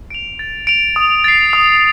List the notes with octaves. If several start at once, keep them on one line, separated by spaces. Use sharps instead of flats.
D7 F7
A6
D7 F7
D#6
A6 C7
D#6